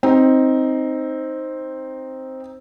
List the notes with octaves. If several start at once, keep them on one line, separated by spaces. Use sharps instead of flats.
C4 D#4